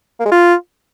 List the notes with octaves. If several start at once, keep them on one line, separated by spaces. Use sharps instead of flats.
A#3
G#3
F4